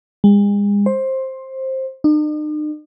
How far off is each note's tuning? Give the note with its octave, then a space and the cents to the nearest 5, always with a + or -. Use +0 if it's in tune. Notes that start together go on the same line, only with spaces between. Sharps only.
G#3 -40
C5 +15
D#4 -45